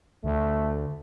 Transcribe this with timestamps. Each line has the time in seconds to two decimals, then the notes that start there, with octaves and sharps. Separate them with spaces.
0.24 D2 A3